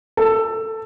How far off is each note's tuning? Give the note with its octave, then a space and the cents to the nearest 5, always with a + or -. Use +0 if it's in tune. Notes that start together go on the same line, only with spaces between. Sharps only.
A4 +10